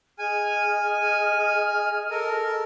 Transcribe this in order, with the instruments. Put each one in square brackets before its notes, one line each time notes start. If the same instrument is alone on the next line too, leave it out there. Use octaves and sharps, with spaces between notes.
[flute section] G#4 D#5 F6 [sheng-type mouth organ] G#5
[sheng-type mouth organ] A4 A#4